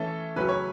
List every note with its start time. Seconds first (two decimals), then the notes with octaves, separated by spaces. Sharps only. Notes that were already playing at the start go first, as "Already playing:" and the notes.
Already playing: E3 A3 C#4 A4
0.36 C#3 F#3 A3 C#4 B4
0.49 C#5